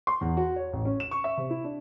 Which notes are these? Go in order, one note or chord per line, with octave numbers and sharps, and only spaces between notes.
C6
E2
F#4
C#5
A1
C#4
E7
C#6
E5
C3
E4
D4